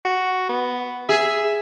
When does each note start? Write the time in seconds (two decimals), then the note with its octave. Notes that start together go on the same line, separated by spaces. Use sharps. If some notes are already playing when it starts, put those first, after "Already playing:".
0.05 F#4
0.49 B3
1.09 G#4 E5